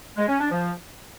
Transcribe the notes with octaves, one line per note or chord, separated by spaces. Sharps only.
G#3
C#4
D4
F3